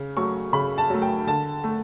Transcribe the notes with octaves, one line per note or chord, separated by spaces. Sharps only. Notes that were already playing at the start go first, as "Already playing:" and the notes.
Already playing: C#3
F#3 A3 C#6
C#3 B5
A5
F#3 A3
G5
D3 A5
A3